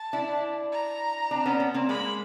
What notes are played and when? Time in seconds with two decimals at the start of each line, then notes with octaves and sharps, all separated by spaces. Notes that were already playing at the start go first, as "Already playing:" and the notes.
Already playing: A5
0.13 D4 E4
0.72 A#5
1.31 C4 D4
1.46 B3 C#4
1.60 B3 C#4
1.74 A#3 C4
1.89 G#3 A#3 B5